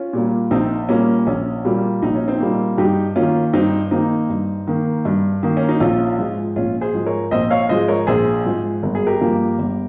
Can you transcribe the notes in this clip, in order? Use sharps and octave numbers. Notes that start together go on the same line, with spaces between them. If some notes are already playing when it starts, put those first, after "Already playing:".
Already playing: C#4 F4
A#2 G3 A#3
A#1 C4 D#4
A#2 G3 A#3 C#4
A#1 C#4
A#2 G3 A#3
A#1 D#4
C#4
C4 D#4
A#2 G3 A#3
G2 D#4 G4
D#3 A#3 C#4 F4
G2 C4 D#4
D#3 A#3 C4 D#4
G2
D#3 A#3
G2
D#3 A#3
C#4
D#4
A#1 C#4 F4
G#2 F3 G#3
A#1 C#4 F4
G#4 C5
G#2 F3 G#3
A#4 C#5
A#1 C5 D#5
C#5 F5
G#2 F3 G#3 C5 D#5
A#4 C#5
A#1 G#4 C5
G#2 F3 G#3
G1 A#4
G#4
G4 A#4
G2 F3 A#3
G1